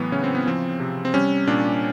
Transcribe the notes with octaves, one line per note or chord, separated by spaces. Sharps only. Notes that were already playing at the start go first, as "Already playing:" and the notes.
Already playing: A2 E3 F#3 B3
C#3 C#4
C4
B3
F3 C4
C3
C4
G3 C#4
A#2 D4